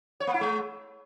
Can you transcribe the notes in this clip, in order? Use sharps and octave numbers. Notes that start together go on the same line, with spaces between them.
C#5
A#3
E4
G#3